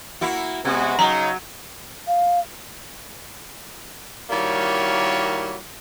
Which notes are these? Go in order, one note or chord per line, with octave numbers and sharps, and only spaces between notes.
A#3 E4 F#4
C3 G#3 B3 F#4
C#3 F#3 D#4 A#5
F5
D#3 G3 A#3 E4 F#4 C#5